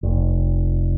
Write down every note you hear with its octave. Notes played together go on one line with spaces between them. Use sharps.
F1